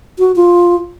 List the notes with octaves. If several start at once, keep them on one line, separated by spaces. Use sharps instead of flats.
F#4
F4